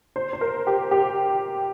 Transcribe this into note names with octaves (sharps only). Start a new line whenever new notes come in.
C5
C5
A#4
G4
G4